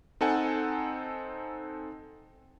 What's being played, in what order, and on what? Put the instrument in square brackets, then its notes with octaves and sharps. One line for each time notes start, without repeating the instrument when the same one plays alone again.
[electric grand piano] C4 D#4 A4 F#5 G#5